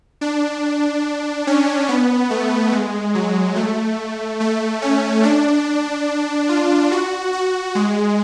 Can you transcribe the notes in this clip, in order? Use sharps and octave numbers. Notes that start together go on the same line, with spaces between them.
D4
C#4
B3
A3
G#3
F#3
A3
A3
C#4
D4
F4
F#4
F#4
G#3